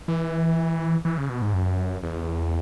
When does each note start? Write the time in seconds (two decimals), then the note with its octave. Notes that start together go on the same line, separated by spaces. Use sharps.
0.08 E3
1.05 E3
1.18 C#3
1.29 B2
1.42 G#2
1.54 F#2
2.03 E2